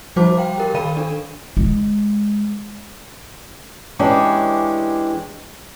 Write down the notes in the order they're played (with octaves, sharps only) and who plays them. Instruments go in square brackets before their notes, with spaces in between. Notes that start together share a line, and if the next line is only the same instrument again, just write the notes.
[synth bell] F3 G3 F#4 C5 A5 D6
F5 G5
G4 A#4
D#3 D5 F5 B5 D#7
D4 A4
[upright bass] G#3
[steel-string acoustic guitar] E3 G#3 C#4 D4 G4